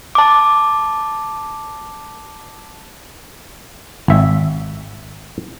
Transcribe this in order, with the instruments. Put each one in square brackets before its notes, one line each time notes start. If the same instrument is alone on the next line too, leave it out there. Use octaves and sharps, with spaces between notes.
[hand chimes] A5 D6
[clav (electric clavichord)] G#1 E5